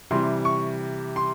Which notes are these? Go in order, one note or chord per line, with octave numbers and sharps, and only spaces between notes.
C3 E3 G3 C6
C#6
C6